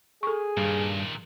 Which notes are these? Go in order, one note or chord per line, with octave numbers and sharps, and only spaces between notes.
G#4 A4 C#6
G2 A#2 D#3